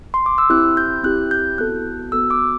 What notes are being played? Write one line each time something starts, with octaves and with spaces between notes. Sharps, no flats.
C6
D6
E6
C4 E4 G4 F#6
G6
C4 E4 G4 F#6
G6
B3 F#4 A4 F#6
B3 F#4 A4 E6
D6